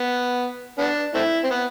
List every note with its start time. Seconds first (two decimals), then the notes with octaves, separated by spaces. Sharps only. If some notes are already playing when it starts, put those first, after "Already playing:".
Already playing: B3
0.78 B3 D4
1.14 A3 C4 E4
1.44 C4
1.50 B3